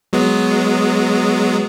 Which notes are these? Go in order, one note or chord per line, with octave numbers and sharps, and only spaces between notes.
F#3 G#3 B3